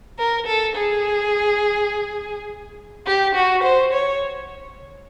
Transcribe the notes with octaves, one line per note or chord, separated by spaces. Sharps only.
A#4
A4
G#4
G4
F#4
C5
C#5